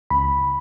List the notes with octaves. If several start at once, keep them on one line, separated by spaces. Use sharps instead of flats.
C#2 B5